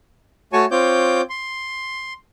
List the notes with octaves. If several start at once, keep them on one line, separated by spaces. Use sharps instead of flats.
A3 F#4 C#5 G#5 A5 C#6
C4 F4 C#5 D6 G6
C6